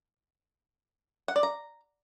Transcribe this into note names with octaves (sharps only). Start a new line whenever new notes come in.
F#5
D5
A#5